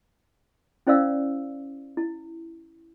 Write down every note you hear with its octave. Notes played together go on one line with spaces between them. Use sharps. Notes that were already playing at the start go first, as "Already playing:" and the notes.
C#4 E4 C5 D5 F5 E6
E4